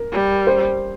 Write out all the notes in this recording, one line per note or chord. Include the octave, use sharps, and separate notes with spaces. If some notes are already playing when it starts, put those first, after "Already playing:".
Already playing: A#4
G3
C5